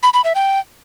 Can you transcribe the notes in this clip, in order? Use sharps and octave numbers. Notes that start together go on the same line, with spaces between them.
B5
B5
E5
G5